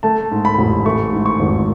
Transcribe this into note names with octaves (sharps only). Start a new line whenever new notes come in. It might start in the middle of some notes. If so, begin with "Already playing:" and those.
A3 A5
G#2
B5
A1
A3 C#6
G#2
C#6
G#1